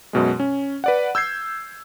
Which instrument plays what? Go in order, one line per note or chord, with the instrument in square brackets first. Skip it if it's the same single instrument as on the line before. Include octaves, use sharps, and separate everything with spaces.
[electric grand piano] F#2 B2 G#3
C#4
B4 D5 F#5
E6 G6 G#6 C7